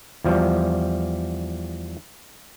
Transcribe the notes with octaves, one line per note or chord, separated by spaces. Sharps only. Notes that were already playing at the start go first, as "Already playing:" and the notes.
E2 F3 G3